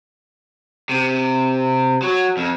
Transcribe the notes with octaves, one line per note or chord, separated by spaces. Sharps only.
C3
F#3
F2